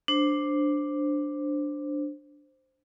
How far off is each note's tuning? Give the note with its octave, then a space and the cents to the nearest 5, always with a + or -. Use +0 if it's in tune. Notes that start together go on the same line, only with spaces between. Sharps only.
D4 +0 C5 +0